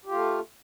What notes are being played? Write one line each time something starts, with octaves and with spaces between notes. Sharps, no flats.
A3 F4 G4